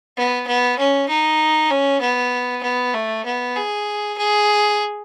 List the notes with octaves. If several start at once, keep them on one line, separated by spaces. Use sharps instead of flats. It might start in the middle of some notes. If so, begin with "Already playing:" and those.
B3
B3
C#4
D#4
C#4
B3
B3
A3
B3
G#4
G#4